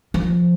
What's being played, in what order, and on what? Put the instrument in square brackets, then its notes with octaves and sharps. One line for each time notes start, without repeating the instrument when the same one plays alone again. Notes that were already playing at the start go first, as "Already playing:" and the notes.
[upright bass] F3